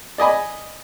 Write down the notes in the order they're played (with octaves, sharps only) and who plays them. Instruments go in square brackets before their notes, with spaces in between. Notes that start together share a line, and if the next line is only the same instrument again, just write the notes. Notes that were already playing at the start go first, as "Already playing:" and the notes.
[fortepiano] D5 D#5 G#5 B5